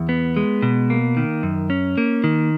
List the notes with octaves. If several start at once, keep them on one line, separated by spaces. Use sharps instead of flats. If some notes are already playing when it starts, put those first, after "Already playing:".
Already playing: E2
B3
G#3
B2
A#3
D#3
F#2
C#4
A#3
D#3